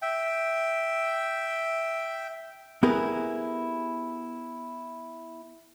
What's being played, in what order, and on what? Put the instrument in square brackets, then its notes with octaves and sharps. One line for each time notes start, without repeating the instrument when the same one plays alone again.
[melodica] E5 G5
[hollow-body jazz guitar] B3 E4 G4 G#4 A#4 B4